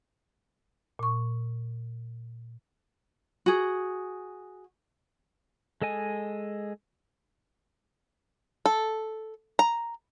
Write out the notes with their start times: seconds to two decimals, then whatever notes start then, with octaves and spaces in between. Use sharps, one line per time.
0.99 A#2 C#6
3.46 F#4 G#4
5.82 G#3 A4 D#5 G#5
8.66 A4
9.59 A#5